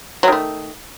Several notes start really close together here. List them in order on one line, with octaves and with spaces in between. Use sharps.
F#3 D#3 A3